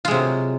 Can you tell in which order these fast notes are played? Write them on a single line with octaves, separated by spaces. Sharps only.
F4 G#3 C3 F#3